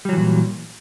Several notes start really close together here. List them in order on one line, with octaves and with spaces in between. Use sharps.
G3 F#3 E3 A#2